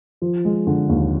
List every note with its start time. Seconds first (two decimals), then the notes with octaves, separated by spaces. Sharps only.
0.22 F3
0.45 G#3
0.67 D3
0.89 D#2